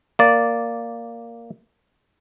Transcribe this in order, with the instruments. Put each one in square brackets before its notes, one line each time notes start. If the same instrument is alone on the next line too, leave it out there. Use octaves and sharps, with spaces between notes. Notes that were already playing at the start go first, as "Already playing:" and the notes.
[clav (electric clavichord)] A#3 D5